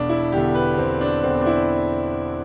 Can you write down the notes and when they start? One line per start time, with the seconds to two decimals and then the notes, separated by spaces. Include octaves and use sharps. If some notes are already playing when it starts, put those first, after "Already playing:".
Already playing: E1 D4
0.09 E4
0.32 E2 D3 G4
0.55 B4
0.78 E1 C4
1.01 D4
1.23 E2 D3 C4
1.41 D4
1.46 E4